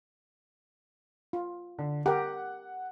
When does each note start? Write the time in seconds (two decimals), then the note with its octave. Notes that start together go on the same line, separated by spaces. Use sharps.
1.33 F4
1.79 D3
2.06 G4 A#4 F#5